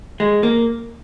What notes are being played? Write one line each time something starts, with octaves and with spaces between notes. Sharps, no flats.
G#3
A#3